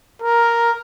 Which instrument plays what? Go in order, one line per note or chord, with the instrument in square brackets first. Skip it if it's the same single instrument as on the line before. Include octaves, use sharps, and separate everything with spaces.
[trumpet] A#4